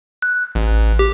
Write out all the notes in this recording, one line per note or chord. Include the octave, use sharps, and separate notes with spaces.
F#6
A1
G4